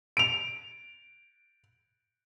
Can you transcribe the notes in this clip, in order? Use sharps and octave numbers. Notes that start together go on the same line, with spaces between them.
D7 F7